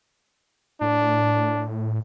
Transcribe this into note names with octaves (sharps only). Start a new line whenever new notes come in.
A2 D4